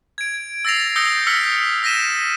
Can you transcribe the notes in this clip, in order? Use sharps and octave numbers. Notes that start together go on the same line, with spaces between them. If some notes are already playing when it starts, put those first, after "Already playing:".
G#6 D7
E6 A6 A#6 C7 F7
D#6 E6 G6 A#6 C#7 G7
E6 F6 B6 C#7
F6 A#6 B6 D#7 E7